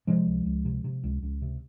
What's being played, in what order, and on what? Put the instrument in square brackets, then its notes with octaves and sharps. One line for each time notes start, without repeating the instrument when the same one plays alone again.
[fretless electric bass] C3 F3 G#3
C#2
C#2
C3
C3
C#2
C#2
C3